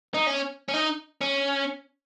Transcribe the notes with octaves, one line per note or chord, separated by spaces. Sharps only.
D#4
C#4
C#4
D#4
C#4